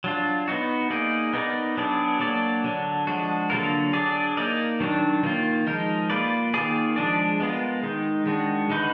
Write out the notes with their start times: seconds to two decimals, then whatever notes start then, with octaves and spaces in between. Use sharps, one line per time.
0.04 F#3 D4 F4
0.48 B3 D#4 F#4
0.90 A#3 D#4 G#4 D5
1.33 B3 D#4 A#4 D5
1.77 F#3 B3 D4 G#4 D5
2.20 F#3 A#3 D4 F#4 D5
2.64 D3 F#3 D4
3.07 F3 G#3 D4 F#4
3.50 D3 F#3 A#3 F4 A#4
3.93 F#3 D4 G#4 D5
4.37 A#3 D#4 A#4 D5
4.80 D#3 F#3 D4
5.23 D#3 A#3 F4
5.67 F3 G#3 D#4 A#4
6.10 A#3 F4 B4 D5
6.54 D#3 A#3 F4 G#4 D5
6.96 F3 G#3 D4 G#4 D5
7.40 G#3 B3 F4 A#4
7.83 D#3 G#3 D#4
8.26 D#3 G#3 D4 F#4
8.70 D3 G#3 D#4 F#4 B4